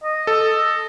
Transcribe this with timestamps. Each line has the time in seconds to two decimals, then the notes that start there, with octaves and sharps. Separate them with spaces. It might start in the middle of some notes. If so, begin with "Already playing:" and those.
0.04 D#5
0.27 A4